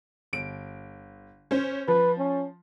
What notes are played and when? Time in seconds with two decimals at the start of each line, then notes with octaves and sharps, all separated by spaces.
0.33 G1 D7
1.51 C#4 C5
1.88 F3 B4
2.19 C#4